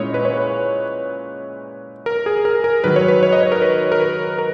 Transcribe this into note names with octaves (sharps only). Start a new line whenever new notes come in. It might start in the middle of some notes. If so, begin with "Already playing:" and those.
Already playing: A#2 G#3 C#4 E4 C#5 D#5
B4
C#5
B4
A#4
G#4
A#4
A#4
G#2 D#3 F#3 B4
C#5
B4
C#5
D#5
C#5
A#4
B4
A#4
B4
A#4